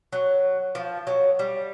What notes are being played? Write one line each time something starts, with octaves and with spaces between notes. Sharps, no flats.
F#3
F3
F#3
G3